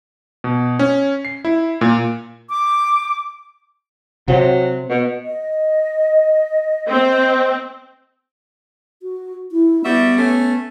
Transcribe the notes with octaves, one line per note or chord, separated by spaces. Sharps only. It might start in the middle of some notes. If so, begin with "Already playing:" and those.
B2
C#4
C7
E4
A#2
D6
C3 F#3
B2
D#5
C4
F#4
E4
G3 B3 F#4 E5
A3 C#4